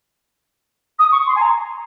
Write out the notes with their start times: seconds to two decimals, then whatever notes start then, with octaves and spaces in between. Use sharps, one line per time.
0.98 D#6
1.11 C#6
1.26 C6
1.35 G#5
1.40 A#5